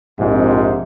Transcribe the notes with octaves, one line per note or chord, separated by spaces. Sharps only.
A#1 F2 G#2 C3